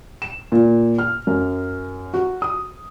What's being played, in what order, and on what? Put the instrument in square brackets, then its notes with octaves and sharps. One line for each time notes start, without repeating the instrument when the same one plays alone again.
[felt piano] E7
A#2
F6
F#2
F#4
D#6